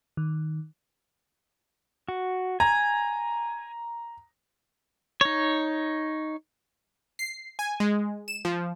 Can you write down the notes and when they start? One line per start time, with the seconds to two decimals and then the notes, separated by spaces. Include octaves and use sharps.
0.17 D#3
2.09 F#4
2.60 G#5 A#5
5.21 D#4 C#5
7.19 C7
7.59 G#5
7.80 G#3
8.28 E7
8.45 F3